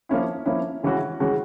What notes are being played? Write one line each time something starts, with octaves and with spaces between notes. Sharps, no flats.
F3 A#3 C#4 E4
F3 A#3 C#4 E4
C#3 E3 G#3 C#4 F#4
C#3 E3 G#3 C#4 F#4